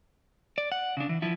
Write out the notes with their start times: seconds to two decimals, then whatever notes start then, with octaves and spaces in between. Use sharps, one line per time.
0.58 D5
0.72 F#5
0.97 C#3 D4
1.09 E3
1.22 F3 E4